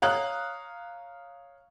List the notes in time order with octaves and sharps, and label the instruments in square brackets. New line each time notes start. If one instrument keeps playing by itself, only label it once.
[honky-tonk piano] C#5 F5 A#5 D#6 F#6